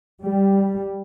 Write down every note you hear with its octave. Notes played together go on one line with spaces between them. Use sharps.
G3